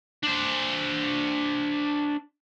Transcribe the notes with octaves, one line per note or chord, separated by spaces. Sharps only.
D4 C5